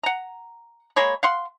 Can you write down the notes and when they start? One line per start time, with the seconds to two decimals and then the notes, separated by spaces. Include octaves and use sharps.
0.03 F#5 A#5
0.96 G#3 A#3 C#5 B5
1.23 F5 F#5 C6